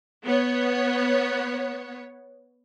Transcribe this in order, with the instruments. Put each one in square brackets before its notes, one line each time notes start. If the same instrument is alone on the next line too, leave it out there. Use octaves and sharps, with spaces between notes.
[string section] B3 C#5